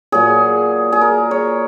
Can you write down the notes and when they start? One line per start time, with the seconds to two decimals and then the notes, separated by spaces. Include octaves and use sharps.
0.12 A#2 F#3 G#4
0.92 G#4
1.01 A#4
1.31 C#5